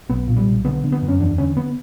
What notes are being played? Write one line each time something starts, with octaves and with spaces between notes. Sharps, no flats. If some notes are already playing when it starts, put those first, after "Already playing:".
B1 B3
A#2
G3
B1
D3 B3
D3
B3
F#2
C#4
E2 D4
D3 C#4
B3